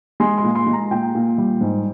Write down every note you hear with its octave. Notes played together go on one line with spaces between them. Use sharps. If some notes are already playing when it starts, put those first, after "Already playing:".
G#3 C6
C6
A#2
C6
G#3
A#5
A#2 G5
A#2
G3
G#2